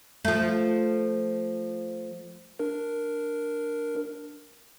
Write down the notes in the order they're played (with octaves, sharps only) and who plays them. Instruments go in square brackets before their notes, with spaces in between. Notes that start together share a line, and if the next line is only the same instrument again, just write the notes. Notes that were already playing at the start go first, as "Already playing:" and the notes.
[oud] F3 A3
[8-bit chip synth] D4 A#4